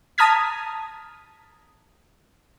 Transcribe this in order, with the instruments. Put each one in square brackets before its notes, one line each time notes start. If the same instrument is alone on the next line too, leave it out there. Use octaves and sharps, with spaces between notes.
[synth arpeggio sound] A5 A#5 D#6 F6 G#6 B6